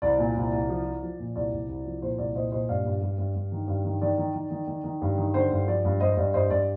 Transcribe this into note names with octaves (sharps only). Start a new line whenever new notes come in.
C2 D5
A#2
C2
C2
F3
F3
F3
A#2
C2 D5
C2
C2
F3
A#2 C5
C2 D5
A#2 C5 D#5
A#2 C5 D#5
G2 D5 F5
G2
G2
G2
G2
D#3
G2
D#3
D#3 D5
D#3
D#3
D#3
D#3
D#3
G2
D#3
D3 C5
G2
F3 D5
G2
G2 C5 D#5
G2 D5
G2 C5 D#5
G2 D5